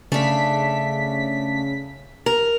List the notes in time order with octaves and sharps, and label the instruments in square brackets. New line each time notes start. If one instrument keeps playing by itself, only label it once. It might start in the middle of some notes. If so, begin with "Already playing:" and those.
[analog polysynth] C#3 B6 [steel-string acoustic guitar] A3 D4
[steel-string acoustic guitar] A#4